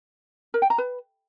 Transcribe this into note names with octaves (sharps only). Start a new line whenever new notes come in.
A#4
G5
A#5
B4